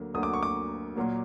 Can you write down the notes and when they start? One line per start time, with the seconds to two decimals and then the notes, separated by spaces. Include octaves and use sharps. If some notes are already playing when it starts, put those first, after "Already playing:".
Already playing: D2 D3 F#3 A#3
0.14 D2 D3 F#3 A#3 D#6
0.23 D6
0.33 C#6
0.43 D6
0.96 A#2 F#3 A#3